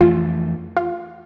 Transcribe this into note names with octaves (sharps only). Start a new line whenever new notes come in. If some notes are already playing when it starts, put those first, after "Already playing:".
F2 E3 A3 F4
F4